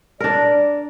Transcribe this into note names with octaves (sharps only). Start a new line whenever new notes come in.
D4 A#4 D5